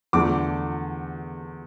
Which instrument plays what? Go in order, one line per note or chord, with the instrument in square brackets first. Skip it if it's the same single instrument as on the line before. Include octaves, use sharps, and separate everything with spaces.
[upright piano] E2 D3 A3 D4 D6